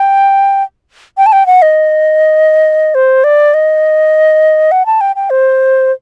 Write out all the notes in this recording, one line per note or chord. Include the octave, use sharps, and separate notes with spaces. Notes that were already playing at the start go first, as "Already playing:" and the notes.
Already playing: G5
G5
A5
G5
F#5
D#5
C5
D5
D#5
F#5
A5
G5
G5
C5